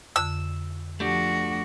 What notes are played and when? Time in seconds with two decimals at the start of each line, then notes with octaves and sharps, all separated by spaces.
0.16 F2 D3 E6
1.00 F3 A3 D4 F#4 G4